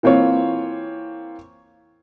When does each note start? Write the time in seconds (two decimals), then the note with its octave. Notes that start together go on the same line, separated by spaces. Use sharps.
0.03 E3 A#3 C4 F4 C#5